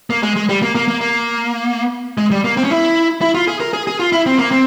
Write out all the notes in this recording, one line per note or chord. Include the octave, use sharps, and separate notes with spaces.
A#3
G#3
G#3
G3
A#3
A#3
A#3
A#3
G#3
G3
A#3
C4
C#4
E4
E4
F4
G#4
A#4
G#4
G#4
F4
E4
C4
A#3
C4